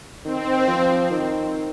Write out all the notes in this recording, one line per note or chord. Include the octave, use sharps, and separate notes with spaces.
D#3 C4
F3
D#3